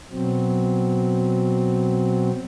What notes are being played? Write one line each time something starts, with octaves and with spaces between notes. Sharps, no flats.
B2 F#3 C4